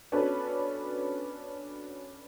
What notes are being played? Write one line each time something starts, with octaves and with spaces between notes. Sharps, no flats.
B3 C#4 D4 F#4 A4 B4